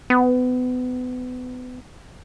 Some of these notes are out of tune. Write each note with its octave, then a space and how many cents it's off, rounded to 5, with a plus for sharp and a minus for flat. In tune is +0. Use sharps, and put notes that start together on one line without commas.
B3 +30